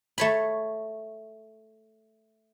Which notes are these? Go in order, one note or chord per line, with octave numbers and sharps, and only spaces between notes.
A3 C#5 B5